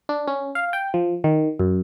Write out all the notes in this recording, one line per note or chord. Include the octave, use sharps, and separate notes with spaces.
D4
C#4
F5
G5
F3
D#3
F#2